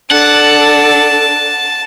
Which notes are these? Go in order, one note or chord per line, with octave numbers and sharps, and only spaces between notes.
D4 A4 F#5 A5